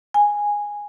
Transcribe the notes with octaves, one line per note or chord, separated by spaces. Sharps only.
G#5